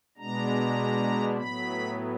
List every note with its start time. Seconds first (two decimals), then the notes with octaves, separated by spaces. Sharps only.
0.17 B2 G#3 B3 D4 A#5
1.37 A2 F#3 B3 B5